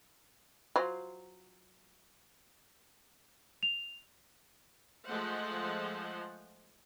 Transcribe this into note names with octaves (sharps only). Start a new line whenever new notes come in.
F#3 F4 C5
F7
F3 G#3 A3 C5 F#5